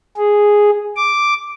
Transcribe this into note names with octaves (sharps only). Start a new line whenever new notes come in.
G#4
D6